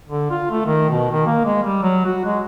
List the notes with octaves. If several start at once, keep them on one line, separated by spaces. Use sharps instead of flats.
D3
F4
A3
D#3
B2
D#3
A#3
G#3
G3
F#3
F#4
G#3